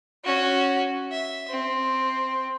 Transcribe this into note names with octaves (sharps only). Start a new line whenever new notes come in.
C#4 F#4
E5
C4